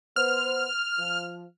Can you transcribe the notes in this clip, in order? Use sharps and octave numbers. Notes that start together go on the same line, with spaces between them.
B3 C5 F6
F3